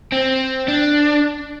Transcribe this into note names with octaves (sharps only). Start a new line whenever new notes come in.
C4
D4